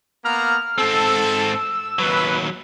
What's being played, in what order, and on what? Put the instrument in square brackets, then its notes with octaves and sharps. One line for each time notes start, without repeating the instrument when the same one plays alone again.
[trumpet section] A#3 B3 A#5 [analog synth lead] F6
[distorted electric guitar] G#2 C4 [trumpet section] A4 [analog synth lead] E6
[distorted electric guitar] D#2 F#3 [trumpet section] B4